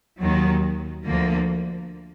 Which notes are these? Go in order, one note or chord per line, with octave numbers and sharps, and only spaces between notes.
D#2 D#3 F#3
D2 D3 F3 A#3